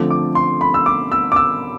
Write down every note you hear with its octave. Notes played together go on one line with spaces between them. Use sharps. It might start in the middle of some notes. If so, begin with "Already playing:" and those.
Already playing: D3 F3 A3 C4 D6
D6
C6
B5
E6
D6
E6
D6
E6